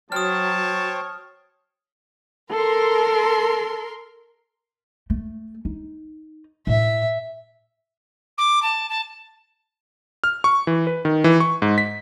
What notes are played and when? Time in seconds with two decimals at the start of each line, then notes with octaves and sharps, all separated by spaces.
0.12 F#3 C5 C#5 G5 A5 D#6 F6
2.51 A4 A#4 C6
5.10 A3
5.65 D#4
6.67 A2 E5
8.38 D6
8.62 A5
8.89 A5
10.24 F6
10.44 C#6
10.67 E3
10.87 B4
11.05 D#3
11.24 E3
11.40 C#6
11.62 G#2
11.78 B6